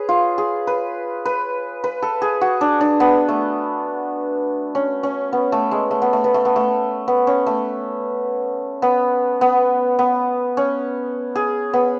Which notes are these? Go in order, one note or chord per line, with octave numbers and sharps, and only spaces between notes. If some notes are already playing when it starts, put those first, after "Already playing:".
Already playing: G#4 B4 C#5
F4
G#4
B4
B4
B4
A4
G#4
F#4
D4
D4
B3
A3
C#4
C#4
B3
A3
G#3
A3
B3
A3
B3
A3
B3
A3
B3
C#4
A3
B3
B3
B3
C#4
G#4
B3